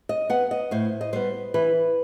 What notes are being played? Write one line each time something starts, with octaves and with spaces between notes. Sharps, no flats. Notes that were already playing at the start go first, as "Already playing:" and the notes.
D#5
B3 F#5
D#5
A2 C5
D#5
G3 B3 C5
E3 B4